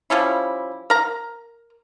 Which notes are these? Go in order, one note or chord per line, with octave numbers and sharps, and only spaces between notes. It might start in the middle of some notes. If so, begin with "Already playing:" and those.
F3 G3 C#4 E4
A#4 A#5